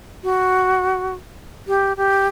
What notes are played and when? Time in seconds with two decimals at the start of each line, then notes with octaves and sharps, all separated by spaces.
0.23 F#4
1.68 G4
1.97 G4